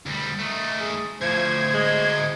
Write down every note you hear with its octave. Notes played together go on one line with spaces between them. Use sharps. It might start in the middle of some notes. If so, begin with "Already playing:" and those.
D2 G3
D#3 A3
G#4
D2 A2 F3 C5 G#6
G#3